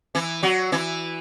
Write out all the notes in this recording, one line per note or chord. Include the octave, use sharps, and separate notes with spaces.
E3 E4
F#3 F#4
E3 E4